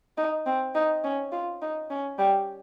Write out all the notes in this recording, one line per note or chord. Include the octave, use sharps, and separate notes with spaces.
D#4
C4
D#4
C#4
F4
D#4
C#4
G3